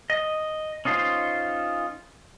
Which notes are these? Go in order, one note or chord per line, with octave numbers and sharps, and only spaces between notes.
D#5
C#4 D#4 F4 C5